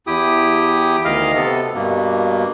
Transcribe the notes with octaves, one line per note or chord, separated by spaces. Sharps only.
E2 E4 G4 G5 D#6
D2 D#3 D#5 F5 F6
C3 B3 A4
G2 B2 A#3